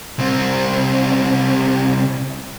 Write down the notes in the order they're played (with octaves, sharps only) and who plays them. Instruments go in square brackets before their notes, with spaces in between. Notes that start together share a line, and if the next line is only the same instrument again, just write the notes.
[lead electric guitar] C2 C4